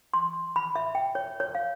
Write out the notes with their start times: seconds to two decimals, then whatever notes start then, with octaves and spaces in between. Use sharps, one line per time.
0.14 C6
0.56 B5
0.76 E5
0.95 G5
1.15 C#5
1.40 C#5
1.55 F5